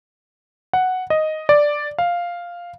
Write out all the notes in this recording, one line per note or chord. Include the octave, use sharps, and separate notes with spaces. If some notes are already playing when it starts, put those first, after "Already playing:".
F#5
D#5
D5
F5